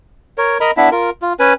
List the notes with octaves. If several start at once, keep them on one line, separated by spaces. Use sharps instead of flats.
A#4 C#5
A#4 D#5 A#5 B5
B3 D4 E4 E5
F4 A#4
F4
C#4 B4 G#5